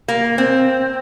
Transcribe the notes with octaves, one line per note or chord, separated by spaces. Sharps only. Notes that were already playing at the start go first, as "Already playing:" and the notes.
A#3
C4